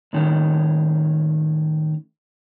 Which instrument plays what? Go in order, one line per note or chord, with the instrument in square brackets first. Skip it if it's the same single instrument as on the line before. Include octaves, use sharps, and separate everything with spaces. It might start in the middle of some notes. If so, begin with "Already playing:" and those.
[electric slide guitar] A2 D#3 C#4